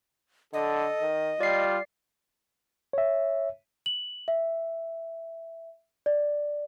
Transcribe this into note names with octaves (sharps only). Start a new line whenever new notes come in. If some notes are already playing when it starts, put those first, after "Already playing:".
D3 A4 D#5
D#3
G3 F4 D5 C7
C#5 E5
F#7
E5
D5